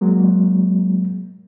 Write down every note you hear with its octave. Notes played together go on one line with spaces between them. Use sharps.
F#3 G#3 A#3